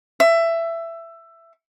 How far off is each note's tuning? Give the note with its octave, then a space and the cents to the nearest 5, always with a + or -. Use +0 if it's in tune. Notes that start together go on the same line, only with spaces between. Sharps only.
E5 +15